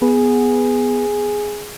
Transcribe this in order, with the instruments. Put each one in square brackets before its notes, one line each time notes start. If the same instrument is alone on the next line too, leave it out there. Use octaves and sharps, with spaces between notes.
[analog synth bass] B3 [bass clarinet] G#4